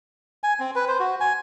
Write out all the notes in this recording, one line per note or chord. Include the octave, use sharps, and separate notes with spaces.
G#5
C4
B4
C5
F#4
G#5